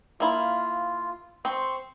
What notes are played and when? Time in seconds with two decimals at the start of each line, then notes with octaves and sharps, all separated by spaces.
0.20 A#3 E4 F4
1.45 C4 C6 C#6